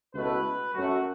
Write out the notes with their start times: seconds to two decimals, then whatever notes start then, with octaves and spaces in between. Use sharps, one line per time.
0.12 C#2 B2 A3 E4 B4
0.73 F#2 F#3 A3 F#4